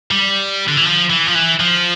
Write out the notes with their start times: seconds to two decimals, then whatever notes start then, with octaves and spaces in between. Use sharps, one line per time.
0.11 G3
0.68 D3
0.77 E3
0.85 F3
1.10 E3
1.27 F3
1.35 E3
1.60 F3